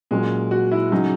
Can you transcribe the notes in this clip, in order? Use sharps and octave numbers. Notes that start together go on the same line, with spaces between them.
A#2 F#3 G#3 C#4
F#4
E4
C#3 F#3 C#4 D#4